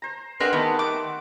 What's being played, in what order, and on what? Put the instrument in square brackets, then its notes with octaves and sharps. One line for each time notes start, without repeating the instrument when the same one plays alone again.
[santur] C5 A#5
[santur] G#3 C4 [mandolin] D4 A#4 F#5 [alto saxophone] B4
[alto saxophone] D#3 [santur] G3 A3 A5 [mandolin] B3
[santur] F#5 [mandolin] D6